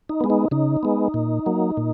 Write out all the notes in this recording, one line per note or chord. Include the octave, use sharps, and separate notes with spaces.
D#4
G#3 B3
D#4
C#3 D#4
G#3 B3
A#2
F#3 A#3
A#2